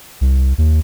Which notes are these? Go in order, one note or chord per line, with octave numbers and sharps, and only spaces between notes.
C2
D#2